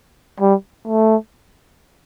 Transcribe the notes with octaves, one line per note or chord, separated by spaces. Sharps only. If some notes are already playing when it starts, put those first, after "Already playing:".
G3
A3